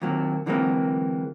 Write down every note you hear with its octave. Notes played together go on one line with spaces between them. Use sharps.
D#2 A#2 F#3 A#3 C4
D3 E3 F#3 G#3 A#3 C4